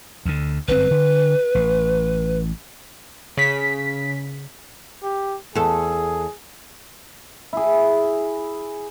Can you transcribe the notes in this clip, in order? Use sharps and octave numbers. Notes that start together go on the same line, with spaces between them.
D2 D3
G1 F#2 C4 B4
D3
A1
C#3 B6
G4
E2 G#4 A4
E4 G#4